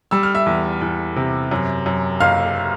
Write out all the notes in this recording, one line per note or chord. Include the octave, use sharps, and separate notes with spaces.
G3 E6
F6
E5 E6
E2
E2
C3
F#2
F#2
F#1 F5 F6